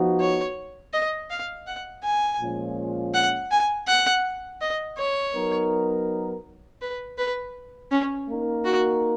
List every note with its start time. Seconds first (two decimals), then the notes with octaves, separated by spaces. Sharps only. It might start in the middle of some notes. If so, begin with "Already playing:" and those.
Already playing: F3 B3 D#4 F#4
0.20 C#5
0.93 D#5
1.30 F5
1.67 F#5
2.03 G#5
2.40 A#2 F3 G#3 C#4 F4
3.14 F#5
3.51 G#5
3.87 F#5
4.61 D#5
4.98 C#5
5.34 F#3 B3 D#4 A#4
6.81 B4
7.18 B4
7.91 C#4
8.29 A#3 D#4 A#4
8.65 F#4